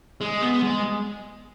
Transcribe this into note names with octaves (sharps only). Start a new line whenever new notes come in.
G#3
B3
G#3